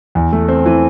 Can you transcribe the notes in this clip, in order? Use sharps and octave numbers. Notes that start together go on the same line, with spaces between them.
E2
A3
C4
E3